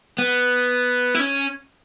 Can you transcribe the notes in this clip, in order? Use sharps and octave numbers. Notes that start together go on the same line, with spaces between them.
B3
E4
C#4